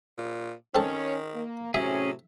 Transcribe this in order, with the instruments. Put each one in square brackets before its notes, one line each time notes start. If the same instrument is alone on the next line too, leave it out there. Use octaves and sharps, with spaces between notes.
[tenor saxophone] A#2
[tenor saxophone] D#3 [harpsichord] C4 A4 [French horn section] C#4
[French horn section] A#3
[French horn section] A2 C3 [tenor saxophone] F#3 [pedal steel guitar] C#4 G#4 [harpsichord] E5